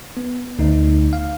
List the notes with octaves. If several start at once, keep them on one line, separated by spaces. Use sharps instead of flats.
B3
D2 D#4
F5